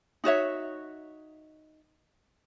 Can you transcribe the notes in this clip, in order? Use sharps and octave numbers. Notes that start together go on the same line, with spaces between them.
D#4 F#4 C#5 E5